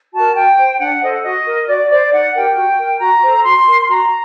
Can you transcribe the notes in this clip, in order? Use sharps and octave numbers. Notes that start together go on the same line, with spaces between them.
F#4 A#4 A5
F#4 G5
C5
D4 F#5
A4 C5 D#5
F#5
F#4 D#5
A#4
F#4 D5
C5 D5
D#4 F#5
G4 A#4 G5
F#4
A#4
F#4 A#5
A4 C5
F#4 C6
A#4
C6
F#4 A#5